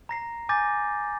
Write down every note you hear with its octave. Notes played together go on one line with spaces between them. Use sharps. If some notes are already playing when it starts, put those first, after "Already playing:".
A#5 A#6 C7
G#5 D6 G6 A6 A#6